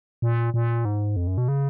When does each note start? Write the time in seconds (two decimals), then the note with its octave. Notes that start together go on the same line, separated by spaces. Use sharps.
0.22 A#2
0.54 A#2
0.85 G#2
1.16 F2
1.27 F#2
1.38 B2
1.48 C#3